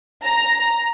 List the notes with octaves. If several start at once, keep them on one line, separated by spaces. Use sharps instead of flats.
A#5